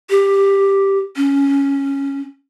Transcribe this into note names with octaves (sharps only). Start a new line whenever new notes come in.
G4
C#4